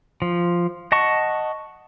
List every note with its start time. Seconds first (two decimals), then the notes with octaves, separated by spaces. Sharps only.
0.22 F3
0.92 D#5 F#5 A5 C#6